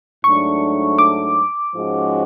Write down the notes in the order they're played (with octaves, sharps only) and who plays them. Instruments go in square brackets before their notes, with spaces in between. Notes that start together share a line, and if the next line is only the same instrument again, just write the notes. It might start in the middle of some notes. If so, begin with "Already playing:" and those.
[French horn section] G#2 F#3 A3 D4 [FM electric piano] C#6
[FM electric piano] D6
[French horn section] G#2 F3 G#3 C#4 F#4